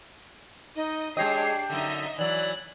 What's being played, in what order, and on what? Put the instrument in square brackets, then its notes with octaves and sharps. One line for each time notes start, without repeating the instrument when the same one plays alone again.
[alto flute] D#4 [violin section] D#5
[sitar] G#3 C#5 D#5 [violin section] D4 C7 [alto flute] G4
[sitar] F#2 D3 [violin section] D#4 D#5 E5
[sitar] E3 F#3 [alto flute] D5 [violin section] F#6